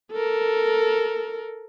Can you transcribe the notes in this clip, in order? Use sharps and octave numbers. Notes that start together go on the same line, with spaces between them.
A4 A#4